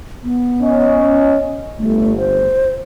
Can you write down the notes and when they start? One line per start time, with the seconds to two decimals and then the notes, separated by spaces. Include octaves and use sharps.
0.23 B3
0.62 C#4 D#5
1.79 G1 A3
2.18 C5